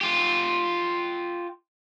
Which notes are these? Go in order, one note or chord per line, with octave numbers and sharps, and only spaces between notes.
F4 G4